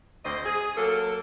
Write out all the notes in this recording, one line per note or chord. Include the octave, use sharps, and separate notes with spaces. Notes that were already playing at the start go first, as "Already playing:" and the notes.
D2 C4 C5 D#5
G#4
F#3 A#3 A4